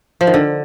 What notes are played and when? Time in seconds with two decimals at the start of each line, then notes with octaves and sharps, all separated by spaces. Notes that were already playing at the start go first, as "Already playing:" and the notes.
0.21 F3
0.27 D#3
0.34 D3